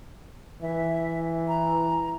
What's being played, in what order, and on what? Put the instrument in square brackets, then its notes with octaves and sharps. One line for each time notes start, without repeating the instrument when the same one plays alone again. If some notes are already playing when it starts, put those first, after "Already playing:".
[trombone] E3 [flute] E5
[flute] A#5